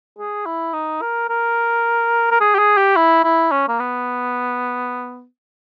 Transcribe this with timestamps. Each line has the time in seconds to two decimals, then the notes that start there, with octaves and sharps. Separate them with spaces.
0.18 G#4
0.46 E4
0.73 D#4
1.02 A#4
1.29 A#4
2.31 A#4
2.40 G#4
2.55 G4
2.59 G#4
2.77 G4
2.96 E4
3.24 E4
3.52 C#4
3.68 A#3
3.80 B3